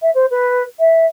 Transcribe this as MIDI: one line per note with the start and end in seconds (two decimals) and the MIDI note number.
0.02 0.10 76
0.14 0.26 72
0.31 0.63 71
0.79 1.06 76